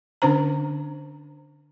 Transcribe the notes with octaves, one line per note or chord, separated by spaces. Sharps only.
D3 C#4 D4 C5 A#5